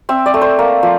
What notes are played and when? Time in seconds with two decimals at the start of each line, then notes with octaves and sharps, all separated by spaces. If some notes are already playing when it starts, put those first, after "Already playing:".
0.09 C4 E5
0.26 D5
0.34 A3
0.41 C5
0.59 A#3
0.83 F3